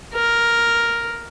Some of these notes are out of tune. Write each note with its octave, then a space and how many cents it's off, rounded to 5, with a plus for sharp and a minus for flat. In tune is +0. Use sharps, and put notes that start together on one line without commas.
A#4 +5